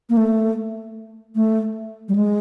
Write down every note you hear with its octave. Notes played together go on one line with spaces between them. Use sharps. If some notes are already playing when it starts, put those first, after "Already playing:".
A#3
A3
A3
G3
G#3